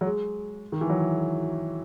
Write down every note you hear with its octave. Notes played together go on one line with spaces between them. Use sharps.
F#3
G#3
D#3
E3
F#3